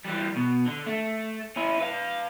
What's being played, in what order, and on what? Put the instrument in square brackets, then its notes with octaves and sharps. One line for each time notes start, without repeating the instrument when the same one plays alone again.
[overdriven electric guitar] E3 G3
B2
D3
A3
C#4 E4
B4 F5